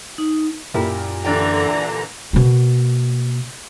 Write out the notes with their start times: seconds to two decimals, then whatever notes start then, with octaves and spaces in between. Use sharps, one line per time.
0.18 D#4
0.74 F#2 A#2 E4 G4 A#4
1.25 D3 E3 D4 D5 G5 A#5
2.33 B2 A#3